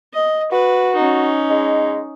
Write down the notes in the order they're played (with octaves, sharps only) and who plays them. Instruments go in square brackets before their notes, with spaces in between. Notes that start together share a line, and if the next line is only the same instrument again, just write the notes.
[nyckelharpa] D#5
[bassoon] F#4 [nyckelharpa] B4
[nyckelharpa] C#4 D#4
[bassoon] G#3